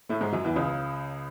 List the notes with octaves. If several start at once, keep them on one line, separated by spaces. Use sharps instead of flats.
A2 A3
G#2 G#3
F#2 F#3
E2 E3
C#2 C#3